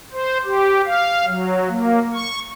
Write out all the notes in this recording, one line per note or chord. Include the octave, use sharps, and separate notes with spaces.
C5
G4
F5
F#3
A#3
C#6